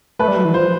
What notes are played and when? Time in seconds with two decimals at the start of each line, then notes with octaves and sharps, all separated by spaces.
0.19 A3 B4
0.28 G3
0.37 F#3
0.45 E3
0.53 F3 C5